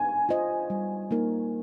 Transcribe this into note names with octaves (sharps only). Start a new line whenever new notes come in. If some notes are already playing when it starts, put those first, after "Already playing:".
Already playing: G#5
F4 C5 D#5
G3
A#3 D#4 A#4